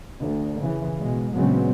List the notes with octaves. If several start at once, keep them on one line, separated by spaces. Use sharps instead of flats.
D2
C#3 E3
B2 G#3
A#2 C#3 F#3 G#3 B3 C4